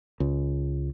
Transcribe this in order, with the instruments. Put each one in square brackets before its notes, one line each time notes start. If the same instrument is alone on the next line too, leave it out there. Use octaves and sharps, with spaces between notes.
[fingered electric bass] C#2